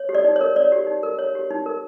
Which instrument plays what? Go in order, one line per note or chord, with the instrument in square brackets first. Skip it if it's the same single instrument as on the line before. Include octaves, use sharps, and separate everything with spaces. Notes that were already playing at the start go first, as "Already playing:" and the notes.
Already playing: [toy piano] C#5
G4
D5
D#4
C#5
A#4
C#5 D5
G4
D#4
A#4
C#5
G4
D#4
A#4